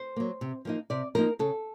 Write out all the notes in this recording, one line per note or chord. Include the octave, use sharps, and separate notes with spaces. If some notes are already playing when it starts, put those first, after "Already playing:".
Already playing: C5
F#3 A#3
C3
F3 A#3 D#4
C3 D5
F3 A#3 D#4 A#4
C#3 A4